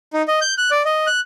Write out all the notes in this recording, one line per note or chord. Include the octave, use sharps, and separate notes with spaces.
D#4
D#5
G6
F#6
D5
D#5
F#6